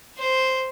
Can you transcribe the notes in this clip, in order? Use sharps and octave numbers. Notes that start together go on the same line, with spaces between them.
C5